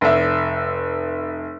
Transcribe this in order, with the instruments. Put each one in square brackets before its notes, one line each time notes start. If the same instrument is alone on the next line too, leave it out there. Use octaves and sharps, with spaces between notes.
[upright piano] F1 E5